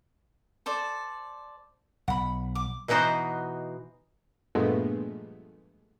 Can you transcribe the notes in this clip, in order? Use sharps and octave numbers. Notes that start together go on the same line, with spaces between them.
A4 C5 D5
B1 F#5 B5
D6
B2 E3 B3 D#4 F#4 C5
G2 A#2 F3 G#3 A3 B3